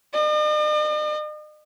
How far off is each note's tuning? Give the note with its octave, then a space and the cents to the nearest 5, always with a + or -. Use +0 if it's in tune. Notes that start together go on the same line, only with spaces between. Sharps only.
D#5 -45